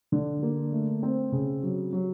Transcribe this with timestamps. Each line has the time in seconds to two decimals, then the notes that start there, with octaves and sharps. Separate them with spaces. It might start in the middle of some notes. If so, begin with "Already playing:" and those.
0.12 D3
0.43 A#3
0.72 A3
1.03 C4
1.32 C#3
1.63 F#3
1.93 F#3